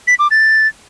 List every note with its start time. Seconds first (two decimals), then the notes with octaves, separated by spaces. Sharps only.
0.08 B6
0.19 D6
0.31 A6